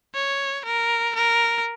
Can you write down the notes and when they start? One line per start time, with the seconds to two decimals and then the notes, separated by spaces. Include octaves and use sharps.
0.15 C#5
0.65 A#4
1.15 A#4